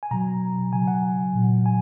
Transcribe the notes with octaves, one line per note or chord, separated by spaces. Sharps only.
G#5
B2 F#3 A#5
C#3 F#3 G#5
F#5
A#2 F#3
G#5